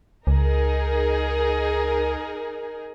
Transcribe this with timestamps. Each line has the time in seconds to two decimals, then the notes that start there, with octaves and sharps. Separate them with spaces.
0.27 C#2 D#4 G#4 A#4